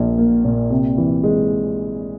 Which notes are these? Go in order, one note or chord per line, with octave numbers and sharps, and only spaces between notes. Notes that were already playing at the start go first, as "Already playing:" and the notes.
Already playing: A#1 A#2 A#3
A#3
A#2
C3
E3
G#3